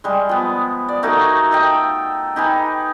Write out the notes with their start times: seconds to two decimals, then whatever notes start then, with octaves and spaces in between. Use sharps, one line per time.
0.04 G3 G#3
0.29 F3 B3
0.88 D5
1.03 A3 A#3 D#4 F#4
1.51 A4 D#5 G5
2.36 D#4 G4 B4 G#5